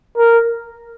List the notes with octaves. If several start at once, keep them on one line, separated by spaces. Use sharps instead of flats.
A#4